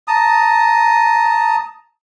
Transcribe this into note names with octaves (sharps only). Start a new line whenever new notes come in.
A5 A#5 D#6